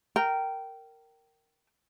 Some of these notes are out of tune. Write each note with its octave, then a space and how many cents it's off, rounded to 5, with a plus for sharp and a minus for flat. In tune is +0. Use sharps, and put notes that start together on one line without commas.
A#4 -10 G5 -15